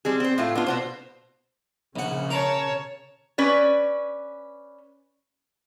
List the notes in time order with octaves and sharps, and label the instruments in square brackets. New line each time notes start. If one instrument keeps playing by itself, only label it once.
[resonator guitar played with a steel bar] G3 C4 G#4
C4 C5
A2 A3 F4
B3 D4 F4
B2 B3 C5
[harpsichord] A#1 F#5 [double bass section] C#3
[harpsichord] A#4 [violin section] C#5 A5
[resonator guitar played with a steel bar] C#4 B4 D5